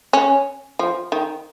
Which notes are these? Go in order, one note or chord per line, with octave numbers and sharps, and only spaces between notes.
C#4
F3
D#3